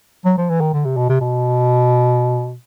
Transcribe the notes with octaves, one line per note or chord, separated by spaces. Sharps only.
F#3
F3
E3
D#3
D3
C3
B2
C3
B2